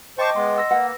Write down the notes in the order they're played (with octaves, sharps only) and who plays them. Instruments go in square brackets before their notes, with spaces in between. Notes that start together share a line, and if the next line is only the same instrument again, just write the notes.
[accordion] C5 A5 C#6 [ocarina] D#5 [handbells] G5 D6
[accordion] G#3 B3 [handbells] C6
[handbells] F#5 E6 A#6
[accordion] A#3 [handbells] B4 [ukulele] F#5